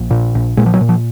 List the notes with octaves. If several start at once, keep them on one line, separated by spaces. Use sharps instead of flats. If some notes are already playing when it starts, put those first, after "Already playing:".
Already playing: A#1
A#2
A#1
A#2 G#3
F3
F#3
A#2
F3